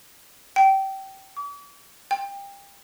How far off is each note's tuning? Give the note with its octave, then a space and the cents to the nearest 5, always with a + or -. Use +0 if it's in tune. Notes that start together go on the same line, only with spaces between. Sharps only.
G5 -20
D6 -45
G5 +25